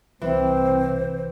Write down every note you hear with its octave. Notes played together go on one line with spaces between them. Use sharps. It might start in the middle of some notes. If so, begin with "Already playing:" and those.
C2 E3 C4 C5